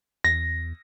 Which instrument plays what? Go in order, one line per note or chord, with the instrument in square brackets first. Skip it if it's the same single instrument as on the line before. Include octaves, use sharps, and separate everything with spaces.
[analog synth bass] E2 [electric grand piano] A#6